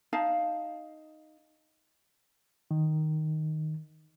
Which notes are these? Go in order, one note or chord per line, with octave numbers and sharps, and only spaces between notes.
D#4 F5 A5
D#3